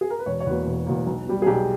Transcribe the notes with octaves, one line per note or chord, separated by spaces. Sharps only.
G#4
A#4
B4
E1 C#5
C#5
E2 B2 A#3 B4
E1
E2 B2 A#3
B1
B2 G3
G#4
B1 G4